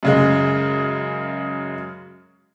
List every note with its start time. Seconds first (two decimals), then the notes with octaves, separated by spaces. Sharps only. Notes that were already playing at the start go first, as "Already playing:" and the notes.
0.03 F#2 C#3 G#3